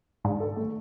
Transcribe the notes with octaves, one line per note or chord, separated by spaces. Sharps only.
G#2 D4
A4
A3